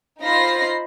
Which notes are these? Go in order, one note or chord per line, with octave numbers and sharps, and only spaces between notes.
D#4 F4 C5 B5 A#6 C7